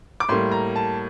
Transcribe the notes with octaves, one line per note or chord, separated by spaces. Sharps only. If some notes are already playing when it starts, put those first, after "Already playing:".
D6
A2 G3 A#3 C6
A#5
A5